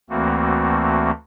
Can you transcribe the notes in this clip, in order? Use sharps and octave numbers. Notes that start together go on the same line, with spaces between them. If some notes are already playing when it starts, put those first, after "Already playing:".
D2 E3 A3 A#3 C4 F#4